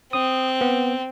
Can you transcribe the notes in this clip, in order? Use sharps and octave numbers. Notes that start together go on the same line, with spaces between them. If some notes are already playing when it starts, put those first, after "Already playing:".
C4 D#6
B3